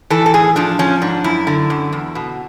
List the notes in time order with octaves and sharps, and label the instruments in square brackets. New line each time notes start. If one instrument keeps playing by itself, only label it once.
[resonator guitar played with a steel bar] E3 A4
A4
A2 G#4
F3 D4
F3 C#4
G#2 D4
F#2 E4
D3
F#2
E2
B2